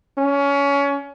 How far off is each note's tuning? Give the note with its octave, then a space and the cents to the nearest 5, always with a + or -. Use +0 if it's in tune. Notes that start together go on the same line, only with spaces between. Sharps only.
C#4 +25